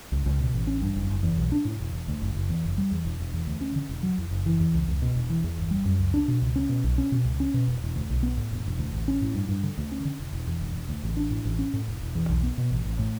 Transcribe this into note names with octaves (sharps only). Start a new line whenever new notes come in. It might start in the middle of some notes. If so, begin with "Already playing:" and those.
C#2
C#2
B2
A1
C#4
G2
F#1
F#1
E2
B1
D4
A2
E1
E1
D2
F#1
F#1
E2
F#1
G3
E2
E1
E1
E2
D2
C#4
D3
E1
F#3
E2
F#1
E3
E2
C#2
C#2
B2
E1
E3
E2
G1
G3
F#2
C#2
D4
B2
C#2
C#4
B2
B1
C#4
B2
C#2
C#4
B2
E1
E1
D2
B1
B3
A2
E1
E1
D2
A1
C#4
A2
G2
G2
D3
D2
C#4
D3
E1
E1
E2
E1
E1
D2
A1
D4
A2
A1
C#4
A2
E1
E1
E2
B1
B3
B2
A1
A1
A2